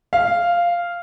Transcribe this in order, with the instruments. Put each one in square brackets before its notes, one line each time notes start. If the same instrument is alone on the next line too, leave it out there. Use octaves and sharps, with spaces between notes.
[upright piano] F5